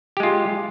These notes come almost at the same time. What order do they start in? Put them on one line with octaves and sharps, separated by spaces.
G4 G#3 F4